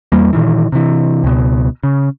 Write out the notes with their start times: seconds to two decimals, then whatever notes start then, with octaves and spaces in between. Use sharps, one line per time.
0.12 E2 G3 A#3
0.33 A#2 D#3 E3
0.72 C3 E3
1.24 C#2 B2
1.84 C#3